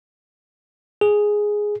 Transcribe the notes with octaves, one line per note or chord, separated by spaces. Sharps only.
G#4